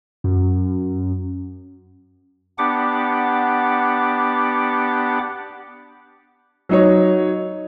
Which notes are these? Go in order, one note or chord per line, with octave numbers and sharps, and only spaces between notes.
F#2
B3 D4 G4 F#5 D6
F#3 D#4 C#5